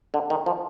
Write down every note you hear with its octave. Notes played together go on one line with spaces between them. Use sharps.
D3
D#3
F3